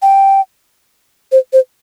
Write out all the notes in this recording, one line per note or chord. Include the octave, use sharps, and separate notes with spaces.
G5
C5
C5